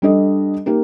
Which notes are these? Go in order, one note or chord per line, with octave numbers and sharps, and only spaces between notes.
G3 D4 A4 D#5
A#3 D#4 G4 A#4